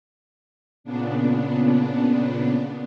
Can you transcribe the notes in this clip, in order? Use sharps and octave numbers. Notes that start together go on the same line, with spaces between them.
A#2 C#3 B3 D4